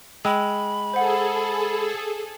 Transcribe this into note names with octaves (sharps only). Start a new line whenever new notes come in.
G#3 G5 B5 E6
G#4 A4 C5 F#5